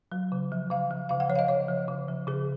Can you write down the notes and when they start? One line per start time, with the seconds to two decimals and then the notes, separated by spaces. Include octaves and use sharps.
0.12 F#3
0.32 C#3
0.52 F3
0.70 C#3 F5
0.91 F3
1.09 C#3 F5
1.20 F#5
1.29 F3 C#5
1.35 F5
1.39 D#5
1.48 C#3 C#5
1.69 F3
1.88 C#3
2.08 F3
2.27 C#3 G#4